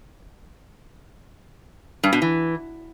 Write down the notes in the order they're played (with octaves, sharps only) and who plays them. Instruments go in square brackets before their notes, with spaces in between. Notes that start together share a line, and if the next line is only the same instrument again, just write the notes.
[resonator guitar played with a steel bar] G2
B2
E3